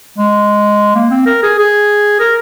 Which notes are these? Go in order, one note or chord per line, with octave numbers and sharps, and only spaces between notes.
G#3
A#3
C4
A#4
G#4
G#4
A#4